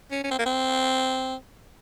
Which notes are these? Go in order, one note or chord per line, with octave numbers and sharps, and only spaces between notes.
C#4
C#4
C4
A#3
C4